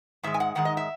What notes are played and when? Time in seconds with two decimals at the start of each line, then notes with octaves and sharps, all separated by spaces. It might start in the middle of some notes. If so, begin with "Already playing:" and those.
0.23 G#2 D#3 G#3 E5
0.34 G#5
0.40 F#5
0.55 G#2 D#3 G#3 F#5
0.65 D#5
0.77 E5